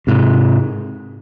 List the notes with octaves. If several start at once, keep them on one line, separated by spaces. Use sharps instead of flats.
G#2 C3